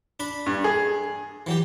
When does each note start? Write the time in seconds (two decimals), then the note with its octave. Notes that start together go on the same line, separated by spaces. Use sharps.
0.20 D4 B5
0.46 G2
0.64 G#4
1.47 E3 F#3 G4